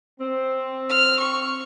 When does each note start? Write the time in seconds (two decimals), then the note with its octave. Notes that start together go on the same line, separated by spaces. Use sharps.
0.20 C4
0.89 F6
1.19 C#6